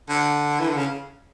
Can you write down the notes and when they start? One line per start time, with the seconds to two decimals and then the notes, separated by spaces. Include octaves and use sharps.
0.09 D3
0.60 E3
0.69 D3
0.76 C#3